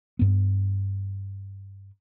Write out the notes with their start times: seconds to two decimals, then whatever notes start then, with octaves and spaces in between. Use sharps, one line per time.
0.19 G2 B3